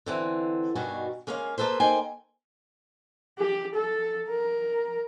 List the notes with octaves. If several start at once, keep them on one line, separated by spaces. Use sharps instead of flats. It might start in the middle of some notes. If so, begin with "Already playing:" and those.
D3 E3 C4
G2 B2 D#3 G3 F#4 G#5
G#3 A#3 C#4 C#5 F5
A#3 G#4 A4 B4 C5
A#3 D#4 C5 G5 G#5
G4
A4
A#4